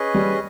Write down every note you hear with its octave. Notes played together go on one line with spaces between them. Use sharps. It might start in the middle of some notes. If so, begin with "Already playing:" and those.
Already playing: C#4 G#4 B4 D#5
G3